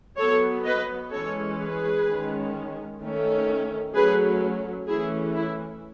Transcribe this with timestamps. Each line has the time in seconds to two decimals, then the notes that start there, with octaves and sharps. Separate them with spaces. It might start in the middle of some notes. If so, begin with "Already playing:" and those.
0.17 F#3 B3 A4 C#5
0.65 B4 D#5
1.12 E3 G#3 C#4 A4 C#5
1.58 G#4 B4
2.07 D#3 G#3 C#4
3.01 D#3 A3 C#4
3.95 F#3 A3 C#4 G#4 B4
4.88 E3 A3 C#4 E4 G#4
5.35 E4